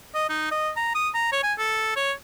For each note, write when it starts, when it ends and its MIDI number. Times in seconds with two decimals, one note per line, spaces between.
0.15 0.27 75
0.29 0.51 63
0.51 0.70 75
0.77 0.91 82
0.94 1.09 87
1.14 1.28 82
1.32 1.39 73
1.43 1.53 80
1.58 1.92 69
1.96 2.12 73